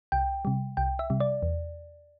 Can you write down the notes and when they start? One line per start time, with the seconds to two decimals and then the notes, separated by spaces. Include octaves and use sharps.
0.12 C2 G5
0.45 C3 G3
0.77 C2 G5
0.99 E5
1.10 C3 G3
1.20 D5
1.43 E2